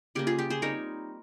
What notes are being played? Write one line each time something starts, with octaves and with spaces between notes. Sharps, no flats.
C#3 G3 A#3 G4
F4 G#4
G4
G#4 C5
G3 C4 D#4 A#4 C#5